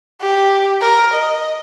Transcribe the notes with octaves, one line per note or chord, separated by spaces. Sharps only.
G4
A#4
D#5